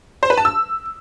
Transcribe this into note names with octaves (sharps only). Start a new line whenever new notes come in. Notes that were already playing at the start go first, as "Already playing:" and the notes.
C5
B4
A5
E6